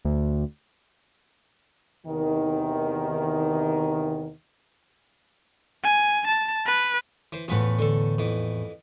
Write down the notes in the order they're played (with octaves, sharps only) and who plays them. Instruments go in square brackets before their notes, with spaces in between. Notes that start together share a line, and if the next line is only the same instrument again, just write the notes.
[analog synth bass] D2
[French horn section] E2 C3 D#3
[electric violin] G#5
A5
B4
[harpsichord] E3 C5
[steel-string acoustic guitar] E2 A2 [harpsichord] F3 B4 F#5
[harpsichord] D3 A4
F2 E3